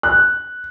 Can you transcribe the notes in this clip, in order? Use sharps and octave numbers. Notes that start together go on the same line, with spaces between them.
F#6